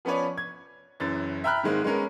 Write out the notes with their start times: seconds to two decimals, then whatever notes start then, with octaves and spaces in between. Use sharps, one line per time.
0.05 F3 B3 C#4 B4 C#5 D5
0.37 G#6
1.00 F#1 F#2 E3 A6
1.44 E5 G5 A#5 B5 F6 F#6
1.63 G#2 D#3 G#3 A#3 C4
1.84 G#3 B3 C#4 A#4